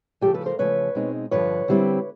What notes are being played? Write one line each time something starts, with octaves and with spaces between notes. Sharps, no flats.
C#3 F3 A3 G4 A4
A4 B4
A#4 C5
E2 C#3 F3 A3 B4 C#5
B2 G#3 C4 D#4
G2 D3 F3 B4 C#5
D3 G3 C4 E4